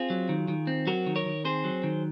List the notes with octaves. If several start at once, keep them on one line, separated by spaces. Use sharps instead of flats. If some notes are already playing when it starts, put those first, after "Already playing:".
Already playing: C4 F4 G#4
F#3
D#3
D#3
C4
F#3 F#4 A#4
D#3
A#4 C#5
D#3
C4 G#4 C5
F#3
D#3